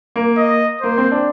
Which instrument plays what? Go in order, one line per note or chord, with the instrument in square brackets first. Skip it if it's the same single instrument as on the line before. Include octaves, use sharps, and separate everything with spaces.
[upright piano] A#3
[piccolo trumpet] D#5
[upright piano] A#3 [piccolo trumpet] C5
[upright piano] C4
D4